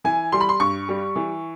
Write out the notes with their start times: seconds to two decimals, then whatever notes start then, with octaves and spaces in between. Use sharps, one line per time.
0.04 E3 G#5
0.32 G3 C6
0.41 B5
0.49 C6
0.60 G2 C#6
0.89 G3
1.16 E3